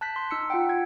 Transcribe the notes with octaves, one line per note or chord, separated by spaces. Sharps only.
A5 F#6 G6 B6
C6
D#4 E6 C#7
F4 F#5 G5
G#6